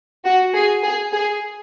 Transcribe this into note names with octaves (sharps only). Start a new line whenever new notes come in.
F#4
G#4
G#4
G#4